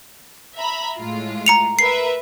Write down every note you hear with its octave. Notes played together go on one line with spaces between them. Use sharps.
E5 A#5 B5
A2 G#3 F4
A#5 C#7 F7
A#4 B4 E5 C7